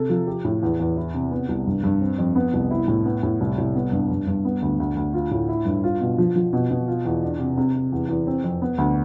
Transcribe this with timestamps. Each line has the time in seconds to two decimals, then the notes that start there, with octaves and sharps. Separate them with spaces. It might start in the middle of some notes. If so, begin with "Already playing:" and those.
Already playing: C3 A4
0.10 F3
0.27 G4
0.45 A2
0.63 E2
0.80 E2
0.97 E4
1.14 C3
1.32 B3
1.49 C2
1.66 G2
1.83 G2
2.01 C4
2.18 F2
2.35 B3
2.53 C2
2.71 E4
2.88 A2
3.05 B3
3.23 A2
3.40 C2
3.58 C2
3.75 B3
3.92 G2
4.10 G2
4.27 G2
4.45 B3
4.62 D2
4.80 D2
4.96 D2
5.14 F4
5.31 A2
5.49 E4
5.65 G2
5.84 F4
6.01 B2
6.18 F3
6.36 F3
6.53 B2
6.70 B2
6.88 F4
7.05 E2
7.23 D4
7.39 C3
7.57 C3
7.75 C3
7.92 E2
8.09 E2
8.27 C4
8.44 F2
8.62 B3
8.78 D2